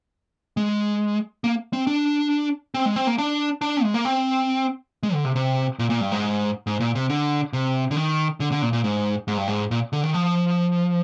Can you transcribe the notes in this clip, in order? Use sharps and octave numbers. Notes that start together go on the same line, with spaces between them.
G#3
A#3
C4
D4
C4
G#3
C4
A#3
D4
D4
G#3
A#3
C4
G#3
D3
C3
C3
A#2
A#2
G2
G#2
G#2
A#2
C3
D3
C3
D3
D#3
D3
D3
A#2
A#2
G#2
G#2
G2
G#2
A#2
D3
D#3
F3